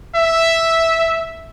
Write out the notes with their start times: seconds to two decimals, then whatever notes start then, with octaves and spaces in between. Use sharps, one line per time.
0.15 E5